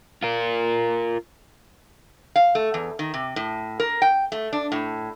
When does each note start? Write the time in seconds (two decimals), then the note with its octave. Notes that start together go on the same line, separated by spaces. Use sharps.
0.23 F4 A#4
2.36 F5
2.55 A3
2.74 E2
2.99 D#3
3.14 C3
3.36 A2
3.80 A#4
4.02 G5
4.32 A3
4.53 D4
4.72 A2